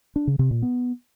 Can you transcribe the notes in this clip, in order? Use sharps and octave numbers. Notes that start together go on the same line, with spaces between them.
D4
C#3
C3
A#2
B3